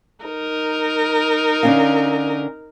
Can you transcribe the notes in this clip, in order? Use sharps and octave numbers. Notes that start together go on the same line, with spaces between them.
D#4 A#4
D3 C#4 F5